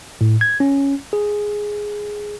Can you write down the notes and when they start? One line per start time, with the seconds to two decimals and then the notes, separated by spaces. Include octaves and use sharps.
0.21 A2
0.41 G#6
0.60 C#4
1.13 G#4